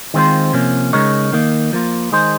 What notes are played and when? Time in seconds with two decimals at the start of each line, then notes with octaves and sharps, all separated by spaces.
0.14 D#3 G#3 C4 F4 C5
0.53 C3 F3 A#3 C#4
0.93 C#3 G#3 D#4 A#4 C#5
1.33 D#3 A#3 D#4
1.73 F3 A#3 F4
2.12 D#3 G#3 D#4 G#4 C5